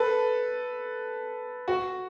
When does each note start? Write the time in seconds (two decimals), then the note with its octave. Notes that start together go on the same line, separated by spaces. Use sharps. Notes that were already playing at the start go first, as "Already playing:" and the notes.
Already playing: A4 B4
1.68 F#4